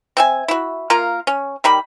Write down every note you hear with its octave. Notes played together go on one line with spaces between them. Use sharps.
C4 E5 G#5
E4 F#4
A#3 F4 A#4
C#4
D#3 G3 B5